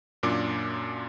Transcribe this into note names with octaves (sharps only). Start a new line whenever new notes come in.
F#2 A#2 D4 D6